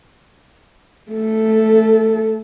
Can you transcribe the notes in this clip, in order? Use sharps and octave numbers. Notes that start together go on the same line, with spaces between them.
A3 A4